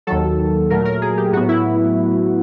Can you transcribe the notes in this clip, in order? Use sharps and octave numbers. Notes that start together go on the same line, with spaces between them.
D#2 D#3 F#3 A4
A#2 F#3 A3 A#4
A#4
G#4
G4
A2 F#3 B3 F#4
E4